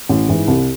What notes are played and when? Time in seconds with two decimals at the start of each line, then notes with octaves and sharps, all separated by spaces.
0.09 A1
0.29 G#2 E3
0.48 C2